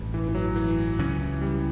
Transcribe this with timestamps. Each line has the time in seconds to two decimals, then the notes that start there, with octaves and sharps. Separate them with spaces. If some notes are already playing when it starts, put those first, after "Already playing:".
Already playing: A1 G2
0.14 E3
0.29 E3
0.35 F#3
0.56 E3
0.99 C#2 C#3 F#3 C#4
1.42 G3